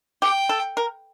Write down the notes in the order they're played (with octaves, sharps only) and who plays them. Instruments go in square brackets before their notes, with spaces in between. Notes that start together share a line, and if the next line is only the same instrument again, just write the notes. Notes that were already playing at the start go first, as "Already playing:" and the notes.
[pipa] G4 [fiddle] G5
[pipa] A4
A#4